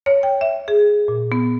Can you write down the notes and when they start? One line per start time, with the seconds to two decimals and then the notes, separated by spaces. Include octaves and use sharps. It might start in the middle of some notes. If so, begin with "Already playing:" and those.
0.06 C#5
0.23 G5
0.41 E5
0.68 G#4
1.08 A#2
1.32 B3